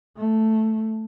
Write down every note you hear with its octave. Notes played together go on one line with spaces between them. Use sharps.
A3